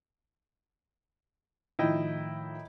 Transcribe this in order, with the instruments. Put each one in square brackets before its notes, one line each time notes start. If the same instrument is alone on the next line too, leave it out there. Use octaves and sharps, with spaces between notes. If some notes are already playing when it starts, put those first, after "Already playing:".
[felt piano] A2 D#3 F3 [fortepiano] E4 D#5 G5